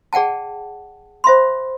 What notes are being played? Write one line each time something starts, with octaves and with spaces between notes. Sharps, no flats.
G#4 D5 F#5 G5 A5
C5 E5 B5 C6